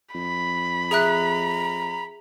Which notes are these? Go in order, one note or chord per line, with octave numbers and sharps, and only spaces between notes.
F2 B5
G#4 E5 A#5 F#6